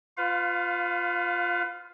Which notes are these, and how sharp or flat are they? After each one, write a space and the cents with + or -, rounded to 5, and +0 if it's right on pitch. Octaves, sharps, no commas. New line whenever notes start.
F4 +0 B4 +35 F5 +20